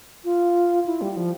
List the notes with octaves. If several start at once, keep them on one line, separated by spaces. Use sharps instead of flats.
F4
E4
G3
F3